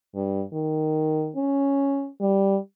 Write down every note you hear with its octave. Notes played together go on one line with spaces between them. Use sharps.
G2
D#3
C#4
G3